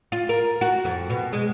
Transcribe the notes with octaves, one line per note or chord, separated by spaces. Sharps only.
F4
A#4
F#4
F2
B2
G#3